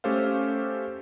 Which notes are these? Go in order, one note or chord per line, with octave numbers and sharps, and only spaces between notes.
A3 C#4 G4 A4 C5 F5